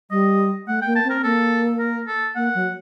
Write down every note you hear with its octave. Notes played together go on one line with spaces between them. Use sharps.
G3 D#5
A3 F#5
A#3 G5
A5
C4
A#4
A#3 A4
A#4
A4
A#3 F#5
F#3